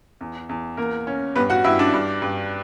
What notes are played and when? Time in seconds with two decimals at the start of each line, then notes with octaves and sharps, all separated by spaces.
0.21 E2
0.49 E2
0.77 E2 A#3 A#4
1.07 C#4
1.36 G2 B3 B4
1.50 F#4 F#5
1.64 G2 E4 E5
1.79 D4 D5
1.93 G2
2.22 G2